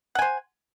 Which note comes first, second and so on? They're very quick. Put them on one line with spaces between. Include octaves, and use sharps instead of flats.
F#5 G#5 C5